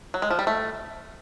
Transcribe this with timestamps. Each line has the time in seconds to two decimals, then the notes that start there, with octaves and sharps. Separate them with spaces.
0.14 F#3
0.22 G#3
0.30 F3
0.39 G3
0.47 A3